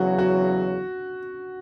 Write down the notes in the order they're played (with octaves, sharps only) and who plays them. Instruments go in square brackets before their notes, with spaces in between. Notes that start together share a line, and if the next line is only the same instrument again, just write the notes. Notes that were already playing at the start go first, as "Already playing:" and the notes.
Already playing: [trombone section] E2 C#3 F#3 [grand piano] F#4
[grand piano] F#4